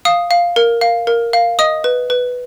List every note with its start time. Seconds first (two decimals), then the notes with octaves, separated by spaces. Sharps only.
0.05 F5 D#6
0.31 F5
0.56 A#4
0.81 F5
1.07 A#4
1.33 F5
1.59 D#5 D#6
1.84 B4
2.10 B4